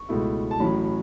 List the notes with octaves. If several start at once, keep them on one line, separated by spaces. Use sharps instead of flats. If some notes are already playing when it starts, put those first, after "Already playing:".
Already playing: C#6
C#2 B2 A3 E4
A5
A1 A2 F#3 C#4 B5